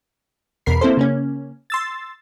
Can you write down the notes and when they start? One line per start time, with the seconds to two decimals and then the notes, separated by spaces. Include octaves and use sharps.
0.66 E2 B2 A#4 B5 C7
0.81 A#3 C4 E4 A4 C5
0.97 C#3 A#3 C#4
1.70 C6 E6 A6